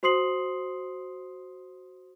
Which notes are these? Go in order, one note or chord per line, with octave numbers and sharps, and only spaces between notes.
F#4 C5 C6 D#6 C7 F#7